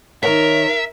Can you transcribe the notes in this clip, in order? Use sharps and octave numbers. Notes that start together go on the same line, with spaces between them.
D#3 A#4 C#5 E5